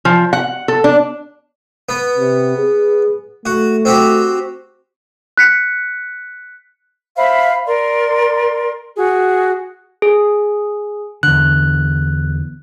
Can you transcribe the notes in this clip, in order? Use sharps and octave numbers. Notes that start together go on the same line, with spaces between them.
F3
F#5
A4
D4
B3
C3
G#4
A3 F#4
C4 F#4 G4
F#6 B6 C#7
C5 E5 F5 B5
A#4 D5 C6
F#4 G#4
G#4
E2 D3 F#6